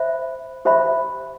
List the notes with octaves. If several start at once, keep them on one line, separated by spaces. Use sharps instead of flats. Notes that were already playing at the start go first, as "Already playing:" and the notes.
Already playing: C5 E5 B5
G4 C5 E5 B5